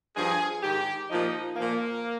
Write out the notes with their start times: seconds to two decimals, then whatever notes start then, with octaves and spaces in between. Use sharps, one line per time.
0.16 G2 F3 G#4
0.63 G#2 D#3 G4
1.10 A#2 F3 D#4
1.56 A#2 F3 A#3